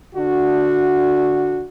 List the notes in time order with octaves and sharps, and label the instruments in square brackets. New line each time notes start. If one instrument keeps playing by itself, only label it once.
[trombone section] D3 D4 F#4